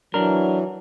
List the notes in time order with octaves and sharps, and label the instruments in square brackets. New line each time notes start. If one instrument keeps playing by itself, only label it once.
[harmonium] E3 [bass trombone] F#3 [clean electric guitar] D4 A#4